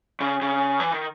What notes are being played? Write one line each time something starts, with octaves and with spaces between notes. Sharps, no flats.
C#3
C#3
E3
D#3